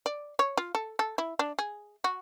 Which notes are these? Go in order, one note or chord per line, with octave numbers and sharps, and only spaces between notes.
D5
C#5
F4
A4
A4
E4
D4
G#4
F#4